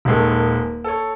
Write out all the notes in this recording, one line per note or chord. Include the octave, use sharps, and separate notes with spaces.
D#1 D#3 G#3 A4
A4 C#5